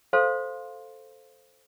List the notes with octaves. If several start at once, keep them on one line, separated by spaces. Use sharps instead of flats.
A4 C5 F5 C6